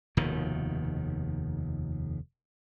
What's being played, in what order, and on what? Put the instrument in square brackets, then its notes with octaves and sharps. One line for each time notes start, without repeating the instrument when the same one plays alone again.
[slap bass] F1 D#2 B2 D#3